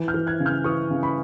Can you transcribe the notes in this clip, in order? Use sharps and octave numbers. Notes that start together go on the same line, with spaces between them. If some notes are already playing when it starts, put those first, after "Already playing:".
Already playing: E3
F6 G6
E3
F#6 G#6
C#3
F6 G6
E3 C#6 D#6
C#3
B5 C#6